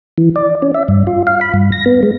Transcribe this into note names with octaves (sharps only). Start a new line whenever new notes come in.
E3
D5
C#4
E5
G2
F4
F5
B5
G2
A#6
B3
G#3